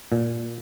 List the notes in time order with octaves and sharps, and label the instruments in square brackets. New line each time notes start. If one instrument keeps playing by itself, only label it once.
[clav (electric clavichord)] A#2